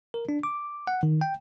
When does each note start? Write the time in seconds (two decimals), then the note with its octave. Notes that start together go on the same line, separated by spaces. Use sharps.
0.14 A#4
0.29 D4
0.43 D6
0.87 F#5
1.03 D#3
1.21 G5